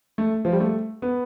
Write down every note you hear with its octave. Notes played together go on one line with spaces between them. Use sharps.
A3
F3
G3
A3
B3